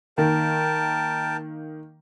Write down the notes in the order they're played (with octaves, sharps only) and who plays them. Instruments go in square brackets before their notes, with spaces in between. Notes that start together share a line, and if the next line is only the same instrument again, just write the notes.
[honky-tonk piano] D#3 A#3 [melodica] A#4 G5 A5